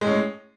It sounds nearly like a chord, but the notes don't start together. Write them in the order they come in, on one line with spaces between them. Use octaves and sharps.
G#3 A2 C#4